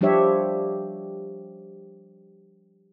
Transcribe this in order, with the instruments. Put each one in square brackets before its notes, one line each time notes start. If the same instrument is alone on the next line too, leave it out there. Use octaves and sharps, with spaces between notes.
[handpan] F3 G3 D4 G4 C#5 E5